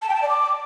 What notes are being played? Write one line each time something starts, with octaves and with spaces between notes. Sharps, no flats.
A5
G5
A5
D5
D6